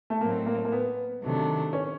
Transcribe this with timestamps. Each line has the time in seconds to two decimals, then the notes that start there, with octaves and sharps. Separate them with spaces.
0.10 A3
0.21 A2 F#3 A3 A#3 C4 D#4
0.46 A#3
0.65 A#3
0.72 B3
1.22 C3 D#3 F#3 A3 D4
1.73 C#4